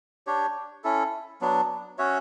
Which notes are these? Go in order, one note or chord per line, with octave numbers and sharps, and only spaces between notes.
D4 G4 C#5
C#4 E4 A4
F#3 B3 D4
C#4 F#4 C#5 E5